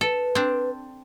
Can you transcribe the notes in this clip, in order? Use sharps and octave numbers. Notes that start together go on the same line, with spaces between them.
A4 B4
C4 D4